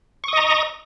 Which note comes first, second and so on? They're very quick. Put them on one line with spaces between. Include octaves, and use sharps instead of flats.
C#6 D#6 D#5 A#5